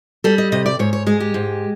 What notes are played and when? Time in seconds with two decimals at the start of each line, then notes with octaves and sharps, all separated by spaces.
0.24 G3 A4
0.38 D#5
0.52 C3 D#5
0.66 D5
0.79 G#2 C#5
0.93 C#5
1.07 G#3 G#4
1.20 G4
1.34 G#2